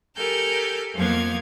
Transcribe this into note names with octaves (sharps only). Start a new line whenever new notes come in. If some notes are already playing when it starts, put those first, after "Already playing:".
G4 A4 A#4 G#5 F6 G6
F2 F3 A#3 B3 F5 G#6